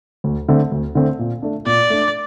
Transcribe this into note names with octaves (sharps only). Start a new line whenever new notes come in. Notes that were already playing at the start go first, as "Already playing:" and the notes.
D2
D3 A3 C4
D2
D3 A3 C4
A#2
A3 D4
A#2 D5
A3 D4